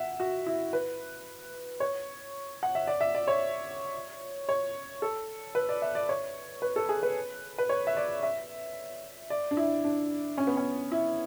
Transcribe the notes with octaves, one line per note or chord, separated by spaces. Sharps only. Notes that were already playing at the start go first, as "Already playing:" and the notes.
Already playing: E5 F#5
F#4
E4
B4
C#5
F#5
E5
D5
E5
D5
C#5
C#5
A4
B4
D5
E5
D5
C#5
B4
A4
G#4
B4
B4
C#5
E5
D5
E5
D5
D4
E4
D4
C#4
B3
C#4
E4